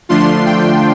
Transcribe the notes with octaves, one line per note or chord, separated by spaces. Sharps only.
D3 F3 A3 D4 F4 C6
G5